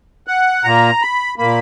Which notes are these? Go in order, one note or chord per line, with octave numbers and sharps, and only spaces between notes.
F#5
A#2 A#3 A#5
B5
A#2 A#3 B5